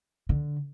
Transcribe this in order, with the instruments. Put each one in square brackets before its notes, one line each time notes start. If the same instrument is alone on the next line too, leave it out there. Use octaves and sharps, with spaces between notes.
[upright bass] D3